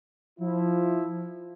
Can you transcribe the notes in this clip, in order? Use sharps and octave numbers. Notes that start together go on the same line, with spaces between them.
F3 E4